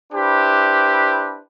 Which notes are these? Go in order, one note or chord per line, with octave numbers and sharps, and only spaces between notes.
D4 E4 G4 B4 C5